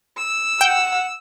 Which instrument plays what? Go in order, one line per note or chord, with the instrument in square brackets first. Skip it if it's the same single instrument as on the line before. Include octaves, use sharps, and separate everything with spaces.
[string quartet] E6
[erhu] F#5 [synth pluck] G5